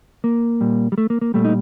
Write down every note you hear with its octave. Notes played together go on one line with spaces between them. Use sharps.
A#3
A#2 G3
G3
A3
A#3
A#3
A#2 G3 A3
D#4